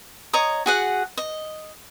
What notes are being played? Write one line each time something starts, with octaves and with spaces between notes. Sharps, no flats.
C#5 D#5 A#5 D#6
F#4 G#4 F#5
D#5